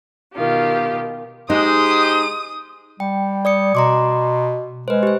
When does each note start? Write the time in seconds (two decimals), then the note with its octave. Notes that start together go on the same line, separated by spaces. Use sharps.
0.34 B2 D#3 F4 G4
1.50 G#3 D#4 G4 C5 D#6
3.00 G3 G5
3.45 D5 D#6 C#7
3.75 B2 A#5 C6 D6
4.88 G#3 B4 C5
5.03 G4 C5